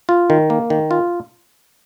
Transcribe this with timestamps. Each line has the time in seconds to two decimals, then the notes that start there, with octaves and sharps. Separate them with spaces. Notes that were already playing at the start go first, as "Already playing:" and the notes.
0.09 F4
0.30 D#3
0.50 A#3
0.70 D#3
0.91 F4